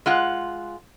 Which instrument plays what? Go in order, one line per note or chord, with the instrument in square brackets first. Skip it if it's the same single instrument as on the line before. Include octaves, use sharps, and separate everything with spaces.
[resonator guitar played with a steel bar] G#3 F4 F#5